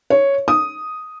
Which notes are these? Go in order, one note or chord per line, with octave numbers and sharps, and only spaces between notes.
C#5
D#6